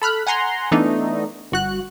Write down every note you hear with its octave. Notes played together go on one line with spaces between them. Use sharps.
A4 B5 F6 F#6
F#5 G#5 A#5 C6
E3 A3 B3 D4 D#4
G1 F#4 F#6